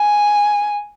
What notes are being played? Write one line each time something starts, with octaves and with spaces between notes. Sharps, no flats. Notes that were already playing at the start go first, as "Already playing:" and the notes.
Already playing: G#5